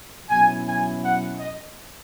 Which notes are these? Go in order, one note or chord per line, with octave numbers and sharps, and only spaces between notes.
B2 F#3 C#4 E4 G#5
G#5
F#5
D#5